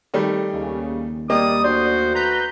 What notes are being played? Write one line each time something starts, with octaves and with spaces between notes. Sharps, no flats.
D#3 G3 A3
D#2 C#3
G3 A#3 G4 D5 D#5 D#6
A3 D4 F#4 A4 C5
B4 A#5 G6